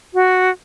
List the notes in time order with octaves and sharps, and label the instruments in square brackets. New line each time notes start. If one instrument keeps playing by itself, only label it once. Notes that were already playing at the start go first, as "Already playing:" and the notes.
[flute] F#4